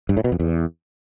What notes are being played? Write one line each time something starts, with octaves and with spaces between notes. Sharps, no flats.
G2
A2
B2
F2
E2